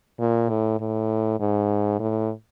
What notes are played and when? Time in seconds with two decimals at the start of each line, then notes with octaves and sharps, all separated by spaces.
0.19 A#2
0.49 A2
0.80 A2
1.40 G#2
2.00 A2